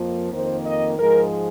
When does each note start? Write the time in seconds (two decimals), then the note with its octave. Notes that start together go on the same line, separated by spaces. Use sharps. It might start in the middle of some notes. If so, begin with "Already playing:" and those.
Already playing: F2 F3 A#3
0.32 F2 D#3 A#3 C5
0.65 D#5
0.98 G#2 F3 G#3 A#4